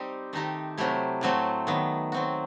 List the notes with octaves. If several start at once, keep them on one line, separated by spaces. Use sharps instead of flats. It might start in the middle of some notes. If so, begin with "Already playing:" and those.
Already playing: G3 C4 D#4 G4
D#3 A3 D#4 G4
C3 F#3 A3 E4 G4
A2 F#3 A3 C4 F#4
D#3 F#3 B3
F#3 C4 F#4